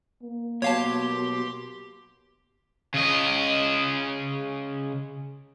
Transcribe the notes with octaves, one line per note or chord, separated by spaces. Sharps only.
A#3
B2 F#3 G4 C#5 F5 A5 C6
C#3 D#5